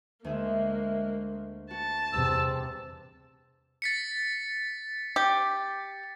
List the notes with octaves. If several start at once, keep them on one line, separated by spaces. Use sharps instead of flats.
D2 G#3 A#3 G#4 E5
F#4 A4 A5
E2 C3 G3 C4 E6
A6 B6 C#7
G4